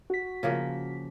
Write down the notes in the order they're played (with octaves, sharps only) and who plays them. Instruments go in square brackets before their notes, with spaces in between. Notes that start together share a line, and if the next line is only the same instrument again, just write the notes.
[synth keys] F#4 B6
[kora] C#3 F3 A#3